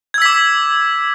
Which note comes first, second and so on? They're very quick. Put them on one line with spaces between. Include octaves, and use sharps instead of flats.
G#6 E6 B6 D6